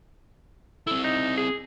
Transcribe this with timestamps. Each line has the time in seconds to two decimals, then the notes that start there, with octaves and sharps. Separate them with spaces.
0.87 C4 E4 A4
1.04 D#4
1.38 G#4